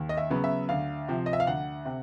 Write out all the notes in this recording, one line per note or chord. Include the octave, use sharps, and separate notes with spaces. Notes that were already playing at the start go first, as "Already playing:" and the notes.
Already playing: D#2
D#5
E5
C#3 F#3 B3
E5
D2 F5
C3 F3
D#5
E5
F5
D2 F#5
C3